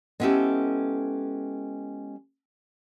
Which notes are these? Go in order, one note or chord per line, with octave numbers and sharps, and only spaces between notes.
G#3 B3 C#4 E4 G4 A4